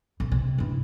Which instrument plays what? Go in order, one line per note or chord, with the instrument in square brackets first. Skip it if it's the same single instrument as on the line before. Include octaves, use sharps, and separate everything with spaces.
[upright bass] B1
C3
G2 E4